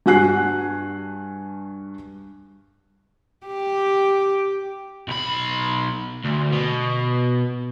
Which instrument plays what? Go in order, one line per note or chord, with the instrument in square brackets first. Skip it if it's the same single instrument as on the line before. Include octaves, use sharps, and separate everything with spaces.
[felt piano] G2 F#4 G#5 F#6 C7
[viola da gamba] G4
[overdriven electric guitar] B1 B5
D2
B2